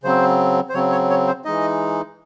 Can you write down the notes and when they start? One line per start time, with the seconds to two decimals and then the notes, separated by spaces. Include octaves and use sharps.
0.04 C#3 F#3 C4 C5
0.69 C5
0.74 C#3 F#3 C4 C#5
0.92 C#5
1.10 C#5
1.27 C5
1.45 E3 G#3 D#4 D#5